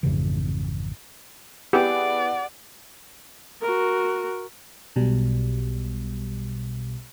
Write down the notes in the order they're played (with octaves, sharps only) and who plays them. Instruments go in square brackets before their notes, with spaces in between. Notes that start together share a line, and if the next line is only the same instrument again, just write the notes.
[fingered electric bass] G#1 F2 C#3 E3
[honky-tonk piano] B3 E4 G#4 [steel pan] G4 [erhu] D5 [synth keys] F#5
[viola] F#4 A#4
[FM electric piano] B1 B2 G3